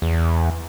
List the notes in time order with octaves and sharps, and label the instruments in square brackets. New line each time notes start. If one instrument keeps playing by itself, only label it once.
[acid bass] E2